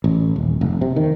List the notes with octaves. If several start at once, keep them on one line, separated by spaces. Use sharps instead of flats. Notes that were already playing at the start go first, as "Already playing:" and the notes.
A1
D#1
F1
C3
D#3